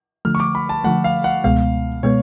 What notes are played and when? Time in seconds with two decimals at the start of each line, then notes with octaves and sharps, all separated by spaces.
0.25 D3 F3 A3 F6
0.35 C#6
0.40 D6
0.55 B5
0.69 A5
0.84 D3 F3 A3 F#5
1.04 F5
1.24 F#5
1.44 C#2 B2 G#3 B3 F5
2.03 B2 G#3 B3 C#5